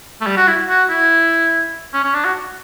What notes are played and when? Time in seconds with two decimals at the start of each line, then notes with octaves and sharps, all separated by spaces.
0.21 A3
0.26 G3
0.37 F#4
0.48 E4
0.69 F#4
0.90 E4
1.94 C#4
2.04 C#4
2.14 D4
2.25 F#4